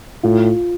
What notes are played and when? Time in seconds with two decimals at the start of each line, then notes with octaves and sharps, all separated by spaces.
0.23 A2 F4